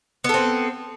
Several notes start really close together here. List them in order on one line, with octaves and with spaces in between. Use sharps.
B3 A4 C4